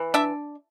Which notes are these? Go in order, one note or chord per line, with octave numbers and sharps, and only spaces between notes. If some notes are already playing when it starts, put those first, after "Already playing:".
Already playing: E3
D4 E5